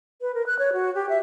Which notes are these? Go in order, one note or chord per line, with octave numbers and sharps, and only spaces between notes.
B4
A#4
F#6
C#5
F#4
G4
E5